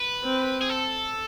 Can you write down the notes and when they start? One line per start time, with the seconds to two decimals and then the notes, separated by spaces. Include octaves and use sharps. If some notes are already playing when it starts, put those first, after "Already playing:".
Already playing: B4
0.24 C4
0.61 G#4
0.69 A4